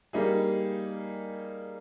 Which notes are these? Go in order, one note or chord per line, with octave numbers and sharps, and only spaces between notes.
G3 A#3 D#4 G#4